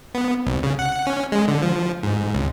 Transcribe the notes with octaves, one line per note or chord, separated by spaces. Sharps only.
B3
C2
C#3
F#5
C#4
G#3
D3
F3
G#2
C#2